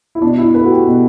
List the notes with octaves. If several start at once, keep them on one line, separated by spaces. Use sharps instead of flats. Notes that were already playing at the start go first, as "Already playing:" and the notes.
E4
B2 D4
E4
A3 B4
F#4
G4
B2